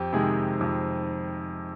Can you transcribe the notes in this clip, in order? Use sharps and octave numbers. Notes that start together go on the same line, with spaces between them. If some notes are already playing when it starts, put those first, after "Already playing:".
Already playing: F2 G4
C3 D#3 G#3 G#4
F2